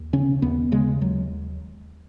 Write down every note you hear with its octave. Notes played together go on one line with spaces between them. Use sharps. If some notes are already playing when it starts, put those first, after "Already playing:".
Already playing: D#2
C#3 C#4
D#2 B3
C#3 G#3
D#2 F#3